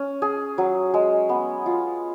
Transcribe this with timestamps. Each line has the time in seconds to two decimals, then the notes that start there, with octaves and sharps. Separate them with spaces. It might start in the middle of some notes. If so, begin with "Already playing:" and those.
Already playing: C#4
0.22 G#4
0.58 F#3
0.94 G#3
1.29 B3
1.66 F4